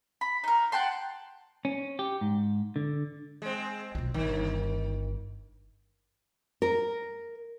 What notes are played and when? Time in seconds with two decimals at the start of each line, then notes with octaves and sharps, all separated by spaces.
0.21 B5
0.44 D#4 A#4
0.72 F#5 G5 A5 C6
1.65 C#4
1.99 G4
2.21 G#2
2.76 D3
3.42 G#3 C4
3.95 B1 F4
4.14 G1 D#3
6.62 A#4